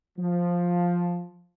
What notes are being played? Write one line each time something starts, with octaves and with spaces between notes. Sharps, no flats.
F3